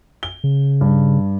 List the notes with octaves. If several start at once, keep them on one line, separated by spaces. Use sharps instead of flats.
G7
C#3
G2